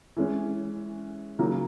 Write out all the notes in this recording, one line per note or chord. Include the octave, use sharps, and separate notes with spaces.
E3 G#3 C#4
C#3 F#3 A#3 D#4